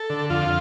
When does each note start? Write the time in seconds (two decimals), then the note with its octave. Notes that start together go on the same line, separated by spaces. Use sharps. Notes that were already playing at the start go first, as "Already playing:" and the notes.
Already playing: A4
0.10 D3
0.30 F2 F4